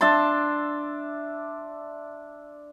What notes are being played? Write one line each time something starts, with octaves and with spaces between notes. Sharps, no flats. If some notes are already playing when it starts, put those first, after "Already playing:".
D4 E5 A5 C6